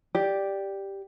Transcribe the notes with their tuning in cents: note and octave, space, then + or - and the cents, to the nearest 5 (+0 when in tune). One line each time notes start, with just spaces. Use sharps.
G4 +0 D5 +0